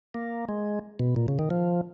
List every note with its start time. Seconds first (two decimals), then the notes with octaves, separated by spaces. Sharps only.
0.14 A#3
0.49 G#3
0.99 B2
1.16 A#2
1.28 C#3
1.39 D#3
1.50 F3